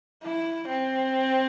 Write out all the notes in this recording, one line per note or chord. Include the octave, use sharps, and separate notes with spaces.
E4
C4